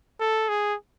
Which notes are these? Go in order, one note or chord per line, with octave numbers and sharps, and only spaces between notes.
A4
G#4